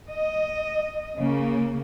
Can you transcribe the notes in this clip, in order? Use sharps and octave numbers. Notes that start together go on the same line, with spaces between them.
D#5
C#3 A#3